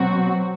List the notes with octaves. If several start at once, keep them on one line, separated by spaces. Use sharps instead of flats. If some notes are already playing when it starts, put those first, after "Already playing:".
Already playing: B2 F#3 C4 F#4